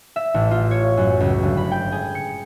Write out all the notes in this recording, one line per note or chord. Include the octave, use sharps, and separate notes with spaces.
E5
A1
F4
C#5
F#2
C#2
G1
B5
G5
G#4
C#7